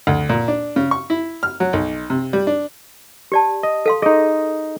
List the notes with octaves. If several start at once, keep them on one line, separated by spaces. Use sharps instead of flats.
D2
A#2
D4
C#3
C#6
E4
F6
F#3
B1
C3
G3
D4
G4 D5 A5
D#5
A4 F5 C6
D#4 G#4 D#5